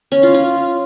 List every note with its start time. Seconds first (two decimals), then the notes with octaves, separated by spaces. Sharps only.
0.12 C#4
0.23 F4
0.34 F4